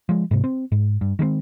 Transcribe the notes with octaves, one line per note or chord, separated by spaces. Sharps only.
F3 G#3
G#2 C3
C4
G#2
G2
D#3 G#3 A#3 C4